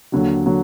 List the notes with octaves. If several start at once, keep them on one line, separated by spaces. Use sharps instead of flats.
D#2 D3 F#3
D3 F#3